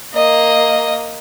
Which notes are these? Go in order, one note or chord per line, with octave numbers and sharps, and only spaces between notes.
A#3 D#5